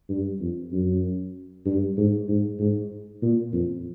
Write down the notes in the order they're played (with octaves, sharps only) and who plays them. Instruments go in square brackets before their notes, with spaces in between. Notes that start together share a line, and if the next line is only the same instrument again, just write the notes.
[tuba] G2
F2
F#2
G2
G#2
G#2
G#2
A#2
F2